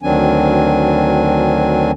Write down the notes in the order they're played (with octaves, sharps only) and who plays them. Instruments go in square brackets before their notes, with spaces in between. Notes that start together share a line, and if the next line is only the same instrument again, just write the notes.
[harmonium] D2 D#3 F#3 C4 D4 G#5